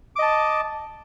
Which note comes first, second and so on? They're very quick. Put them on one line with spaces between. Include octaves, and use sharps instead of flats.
D6 D#5 A5